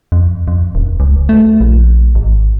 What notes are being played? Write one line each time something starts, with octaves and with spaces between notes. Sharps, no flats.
F2
F2
D#1
C#2
A3
A#1
G#1